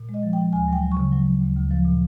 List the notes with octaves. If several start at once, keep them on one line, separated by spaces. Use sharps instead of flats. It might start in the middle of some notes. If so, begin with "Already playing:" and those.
Already playing: A#2
G#3
D#5
F3
G5
F3
D2 G#5
F#3 G5
F#3
C#6
C#3
F#3
F#3
D2
D2
F3
A#2